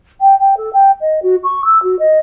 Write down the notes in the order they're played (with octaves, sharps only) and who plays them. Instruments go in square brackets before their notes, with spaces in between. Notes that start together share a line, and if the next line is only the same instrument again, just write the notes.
[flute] G5
G5
A4
G5
D#5
F#4
C#6
E6
F#4
D#5